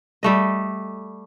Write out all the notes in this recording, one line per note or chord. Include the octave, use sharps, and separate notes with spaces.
G3 A3 D#5